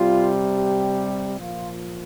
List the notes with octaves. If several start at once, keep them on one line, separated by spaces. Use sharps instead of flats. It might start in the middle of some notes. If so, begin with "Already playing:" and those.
Already playing: C3 G3 F4
G4
A#2 F3 F4